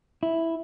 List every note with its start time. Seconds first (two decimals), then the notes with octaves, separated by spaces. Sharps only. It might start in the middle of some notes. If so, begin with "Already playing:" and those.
0.23 E4